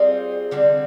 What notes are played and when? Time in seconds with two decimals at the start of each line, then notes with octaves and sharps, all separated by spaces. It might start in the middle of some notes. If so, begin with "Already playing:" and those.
Already playing: G3 C4 F4 G#4
0.51 D3 G3 C4